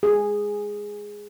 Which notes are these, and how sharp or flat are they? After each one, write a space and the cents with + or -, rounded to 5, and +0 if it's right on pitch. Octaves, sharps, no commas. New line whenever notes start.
G#4 -5